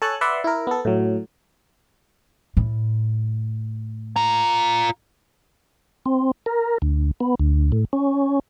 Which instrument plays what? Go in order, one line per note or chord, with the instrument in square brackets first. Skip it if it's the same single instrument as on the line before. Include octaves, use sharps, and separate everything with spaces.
[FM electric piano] A4 C#5 G#5 A5 F#6
B4 D5 E5 F#5 C6
E4 A#4
B3 A4
A2 F#3
[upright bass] A2
[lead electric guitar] F4 A#5
[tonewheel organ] C4
A#4
D2
B3
D2
A2
C#4